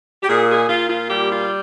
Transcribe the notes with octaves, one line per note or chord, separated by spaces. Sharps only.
G4
A#2 G#4
G#4
A#2 F4
F4
G3 G4
F4